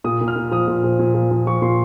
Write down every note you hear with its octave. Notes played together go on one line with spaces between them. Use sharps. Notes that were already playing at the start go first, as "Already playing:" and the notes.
A#2 D#6
A#2
F6
A#2
F3 D#6
A#2
F3
A#2
F3
F3
F3 C#6
A#2 C6